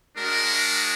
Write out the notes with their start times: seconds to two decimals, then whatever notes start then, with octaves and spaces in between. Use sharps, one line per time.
0.17 G#3 D4 F#4 A#4